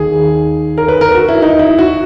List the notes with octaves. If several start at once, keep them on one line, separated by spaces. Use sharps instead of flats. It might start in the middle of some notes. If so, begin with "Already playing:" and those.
Already playing: D#2 D#3 G#4
A#4
B4
A#4
F#4
E4
D#4
E4
F#4